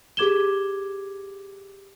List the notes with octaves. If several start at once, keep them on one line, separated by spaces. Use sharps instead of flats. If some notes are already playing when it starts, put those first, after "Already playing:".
G4 G#4 D6 G#6 E7 G7